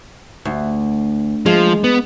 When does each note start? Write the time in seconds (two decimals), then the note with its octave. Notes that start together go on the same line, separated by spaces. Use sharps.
0.45 D2
1.46 F3 G#3
1.84 B3